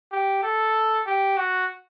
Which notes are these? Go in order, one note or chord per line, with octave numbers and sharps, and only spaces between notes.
G4
A4
G4
F#4